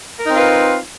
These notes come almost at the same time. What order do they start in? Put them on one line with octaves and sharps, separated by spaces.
A#4 D#4 C4 F4 B4